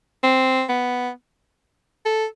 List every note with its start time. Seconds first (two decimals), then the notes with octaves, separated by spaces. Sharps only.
0.23 C4
0.69 B3
2.05 A4